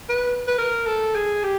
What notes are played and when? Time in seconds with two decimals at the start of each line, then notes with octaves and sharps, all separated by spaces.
0.09 B4
0.47 B4
0.58 A#4
0.86 A4
1.15 G#4
1.43 G4